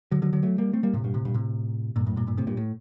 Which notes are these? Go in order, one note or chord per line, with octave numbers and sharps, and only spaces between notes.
D3 F#3
D3 F#3
D3 F#3
F#3 A3
G3 A#3
A3 C4
G3 A#3
A2 C3
G2 A#2
A2 C3
G2 A#2
A2 C3
G2 A#2
F#2 A2
G2 A#2
G2 A#2
A2 C3
G2 A#2
A2